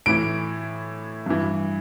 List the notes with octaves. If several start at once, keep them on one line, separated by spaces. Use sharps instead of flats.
A2 E3 D7
G2 E3